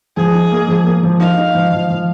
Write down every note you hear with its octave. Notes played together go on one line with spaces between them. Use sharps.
F3 G#4
D#4
A#3
F3
A#3
F3
D#4 F5
D#4
F3
F3
F3